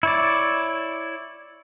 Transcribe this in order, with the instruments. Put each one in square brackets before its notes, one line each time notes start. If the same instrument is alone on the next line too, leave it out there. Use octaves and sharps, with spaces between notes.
[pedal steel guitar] E4 C#5 D5